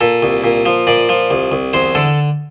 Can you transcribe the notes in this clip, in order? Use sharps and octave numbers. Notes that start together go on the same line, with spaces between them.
A#2 A4
C2
A#2
F3
A#2 D5
F3
C2
C2
E2 C5
D3 A4